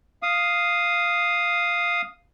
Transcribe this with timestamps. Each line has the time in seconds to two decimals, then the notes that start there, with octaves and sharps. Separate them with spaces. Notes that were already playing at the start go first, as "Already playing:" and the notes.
0.23 F5 D#6